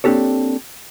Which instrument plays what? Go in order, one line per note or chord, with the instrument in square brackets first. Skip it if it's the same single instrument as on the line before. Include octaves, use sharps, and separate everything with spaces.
[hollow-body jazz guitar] A#3 C4 D4 G4 A4 C#5